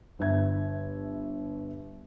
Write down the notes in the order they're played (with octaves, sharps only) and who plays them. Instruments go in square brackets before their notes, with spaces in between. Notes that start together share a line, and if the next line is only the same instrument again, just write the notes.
[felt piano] G1 E5 G#6